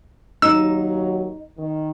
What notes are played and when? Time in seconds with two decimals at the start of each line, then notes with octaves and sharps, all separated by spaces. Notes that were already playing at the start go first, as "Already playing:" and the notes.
0.42 D#2 F#3 D#4 E6
1.57 D#3